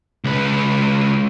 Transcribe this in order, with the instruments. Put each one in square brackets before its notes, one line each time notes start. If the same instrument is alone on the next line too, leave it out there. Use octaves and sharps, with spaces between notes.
[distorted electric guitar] C#2 B4